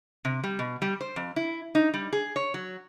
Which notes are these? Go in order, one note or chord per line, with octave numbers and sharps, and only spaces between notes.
C3
G3
B2
G3
C5
F2
E4
D#4
G3
G#4
C#5
F#3